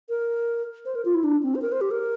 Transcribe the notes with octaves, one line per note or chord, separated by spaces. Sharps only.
A#4
C5
A#4
F4
E4
D4
C4
C5
A#4
C5
G4
A#4